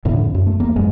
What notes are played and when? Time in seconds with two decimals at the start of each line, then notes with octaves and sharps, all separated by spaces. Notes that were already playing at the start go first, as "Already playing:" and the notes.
0.05 E2 A2 D3
0.18 F2
0.35 F#2
0.47 A3
0.60 E2 A#3
0.76 A1 F#2 F#3 G#3